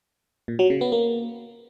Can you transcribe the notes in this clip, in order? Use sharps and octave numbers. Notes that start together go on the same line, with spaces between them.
A#2
F#3
C#3
B3
A#3